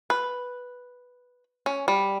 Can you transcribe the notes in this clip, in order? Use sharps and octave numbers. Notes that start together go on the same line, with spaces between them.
B4
C#4
G3